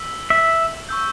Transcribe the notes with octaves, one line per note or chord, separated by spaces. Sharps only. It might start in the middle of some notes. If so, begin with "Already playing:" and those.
Already playing: E6 B6 F#7
E5
C#6 E6 G6